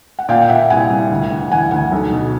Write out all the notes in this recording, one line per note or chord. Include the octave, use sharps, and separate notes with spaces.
F#5
A#2 F5 G5
G5
A#2 E5 F#5
C2 F#5 G#5
C2
D2
D2
E3 F#5 G#5
D2 F#5 G#5
B1
B2